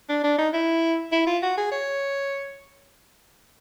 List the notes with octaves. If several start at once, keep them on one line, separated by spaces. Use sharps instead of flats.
D4
D4
D#4
E4
E4
F4
F#4
G#4
C#5